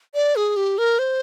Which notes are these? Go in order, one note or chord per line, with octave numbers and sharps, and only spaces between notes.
D5
G#4
G4
A#4
C5